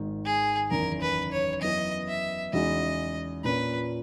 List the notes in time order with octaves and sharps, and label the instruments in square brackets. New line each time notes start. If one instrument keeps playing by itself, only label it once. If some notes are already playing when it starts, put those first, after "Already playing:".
Already playing: [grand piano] G#1 G#2 D#3
[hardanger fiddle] G#4
[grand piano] F#1 E2 D#3 [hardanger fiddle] A#4
[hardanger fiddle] B4
C#5
[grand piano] F#2 E3 B3 [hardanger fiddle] D#5
[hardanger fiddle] E5
[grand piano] E2 C#3 G#3 D#4 F#4 [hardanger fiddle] D#5
[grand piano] A#2 A#3 C#4 [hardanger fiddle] B4